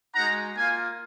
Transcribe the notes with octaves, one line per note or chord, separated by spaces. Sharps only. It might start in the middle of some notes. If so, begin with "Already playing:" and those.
G#3 D#4 F#4 F#5 A#5
A#3 F4 F5 G#5